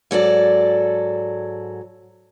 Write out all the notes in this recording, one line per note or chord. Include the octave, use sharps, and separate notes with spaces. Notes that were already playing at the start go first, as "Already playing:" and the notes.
G#2 F#3 A4 D5